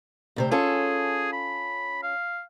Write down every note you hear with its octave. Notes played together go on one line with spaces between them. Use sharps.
D2 C3 C5
C#4 F4 G#4 A4
B5
F5